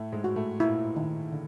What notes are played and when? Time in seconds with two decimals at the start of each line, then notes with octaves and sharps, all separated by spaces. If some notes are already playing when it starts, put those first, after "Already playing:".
Already playing: A2 A3
0.12 G#2 G#3
0.24 F#4
0.36 A2 A3
0.60 A#2 A#3 E4
0.96 D#3
1.32 D3